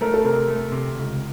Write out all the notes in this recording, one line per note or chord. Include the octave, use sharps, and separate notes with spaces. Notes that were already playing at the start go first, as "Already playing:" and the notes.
A3 A#4
A4
C3 A#4
A3
C3
C#2